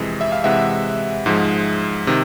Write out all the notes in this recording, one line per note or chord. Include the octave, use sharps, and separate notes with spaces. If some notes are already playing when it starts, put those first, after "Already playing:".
Already playing: F2 C3 E3 G#3 D#5
E5
F5
C3 E3 G#3 E5 F#5
G#2 F3 G#3
C3 D#3